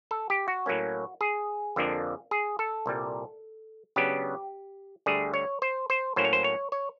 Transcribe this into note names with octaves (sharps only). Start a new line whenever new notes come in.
A4
G4
F#4
A2 F#3 A#3 C#4
G#4
F2 D3 F3 A#3 D4
G#4
A4
C2 A#2 G3
C#3 F#3 B3 D4 G4
D2 D3 G3 G#4
C#5
C5
C5
A2 F#3 A#3 C#4 C5
C#5
C5
C#5
C#5